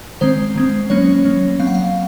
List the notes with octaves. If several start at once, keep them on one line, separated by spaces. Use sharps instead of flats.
D#3 G#3 C4 C5
D#3 G#3 C4
F#3 A#3 C#4 C#5
F#3 A#3 C#4
F#3 C4 F5
F#5
F5